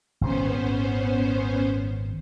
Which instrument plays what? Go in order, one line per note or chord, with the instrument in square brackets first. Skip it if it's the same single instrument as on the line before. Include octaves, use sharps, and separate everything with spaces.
[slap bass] G#1 A#2 [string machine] B3 C#4 C5